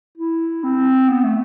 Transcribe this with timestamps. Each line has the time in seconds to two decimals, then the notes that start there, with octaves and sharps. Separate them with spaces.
0.17 E4
0.63 C4
1.09 B3
1.24 A3